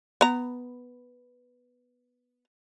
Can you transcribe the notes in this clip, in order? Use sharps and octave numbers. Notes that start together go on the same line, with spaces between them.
B3 A#5